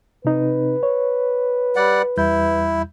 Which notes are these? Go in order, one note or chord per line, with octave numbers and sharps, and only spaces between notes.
C3 C4 D#4 B4
C#5
G3 D5 F#5
E2 G3 E4 G6